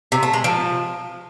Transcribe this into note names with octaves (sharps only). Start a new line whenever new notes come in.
C3
A3
G#3
F3